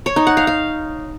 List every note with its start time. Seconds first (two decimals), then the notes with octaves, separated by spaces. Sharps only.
0.06 C#5
0.16 D#4
0.27 F#5
0.37 F5
0.47 F5